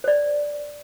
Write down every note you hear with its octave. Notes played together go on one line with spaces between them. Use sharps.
C5 D5